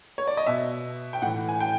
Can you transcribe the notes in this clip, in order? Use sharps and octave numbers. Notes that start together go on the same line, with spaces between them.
C#5
D5
D#5
B2 E5
G5
A2 E3 F#5
G#5
G5